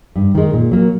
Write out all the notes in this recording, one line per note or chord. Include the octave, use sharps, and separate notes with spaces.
G2
D#3 G#3
A#2
F#3 A#3